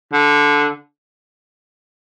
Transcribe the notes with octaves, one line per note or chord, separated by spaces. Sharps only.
D3